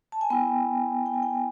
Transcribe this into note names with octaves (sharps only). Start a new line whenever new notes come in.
A5
G#5
B3 E4 G5
G5
G#5
G5